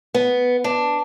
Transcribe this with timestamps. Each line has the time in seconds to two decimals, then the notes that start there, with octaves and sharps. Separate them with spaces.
0.14 B3
0.64 D4